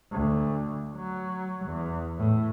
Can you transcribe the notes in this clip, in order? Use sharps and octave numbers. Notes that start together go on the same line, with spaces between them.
D2
F#3
E2
A2